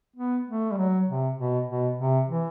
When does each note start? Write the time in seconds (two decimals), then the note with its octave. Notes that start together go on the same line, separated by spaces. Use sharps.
0.16 B3
0.47 A3
0.71 G3
0.77 F#3
1.08 C3
1.38 B2
1.68 B2
1.98 C3
2.29 E3